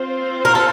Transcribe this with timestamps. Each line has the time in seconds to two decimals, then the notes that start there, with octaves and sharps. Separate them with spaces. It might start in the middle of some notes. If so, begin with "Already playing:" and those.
Already playing: C4 F4 C5
0.45 A#4
0.55 A4